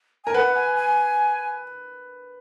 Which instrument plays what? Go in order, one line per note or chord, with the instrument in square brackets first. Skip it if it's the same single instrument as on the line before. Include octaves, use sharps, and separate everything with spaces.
[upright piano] A#4 [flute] G#5
[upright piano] B4 [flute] F#5
[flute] G#5
G#5